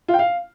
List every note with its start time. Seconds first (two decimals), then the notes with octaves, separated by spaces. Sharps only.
0.08 F4
0.14 G5
0.19 F5